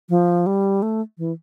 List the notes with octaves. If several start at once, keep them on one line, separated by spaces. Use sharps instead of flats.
F3
G3
A3
E3